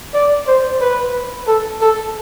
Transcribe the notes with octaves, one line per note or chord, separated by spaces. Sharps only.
D5
C5
B4
A4
A4